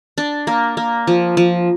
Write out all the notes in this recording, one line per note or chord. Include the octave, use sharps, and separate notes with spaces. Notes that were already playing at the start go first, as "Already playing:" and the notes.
D4
A#3
A#3
F3
F3